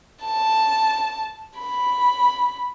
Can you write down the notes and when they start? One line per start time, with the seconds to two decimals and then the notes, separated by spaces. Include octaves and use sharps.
0.25 A5
1.60 B5